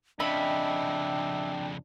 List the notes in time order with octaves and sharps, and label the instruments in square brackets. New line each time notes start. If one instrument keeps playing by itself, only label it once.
[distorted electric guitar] F2 C#3 [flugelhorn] D4 [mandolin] D#5 E5 B5 [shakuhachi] G5